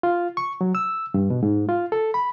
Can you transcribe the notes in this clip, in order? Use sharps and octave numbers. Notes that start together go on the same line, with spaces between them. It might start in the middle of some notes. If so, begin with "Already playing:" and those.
F4
C#6
F#3
E6
G2
B2
G#2
F4
A4
B5